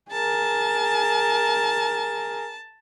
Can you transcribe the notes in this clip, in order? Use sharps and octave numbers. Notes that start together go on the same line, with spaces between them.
G#4 A#4 A5